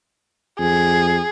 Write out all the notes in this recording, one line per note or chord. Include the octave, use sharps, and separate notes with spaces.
F2 G#4